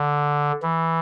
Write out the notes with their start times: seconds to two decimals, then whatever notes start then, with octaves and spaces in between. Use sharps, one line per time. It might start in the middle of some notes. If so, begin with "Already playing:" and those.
Already playing: D3
0.62 E3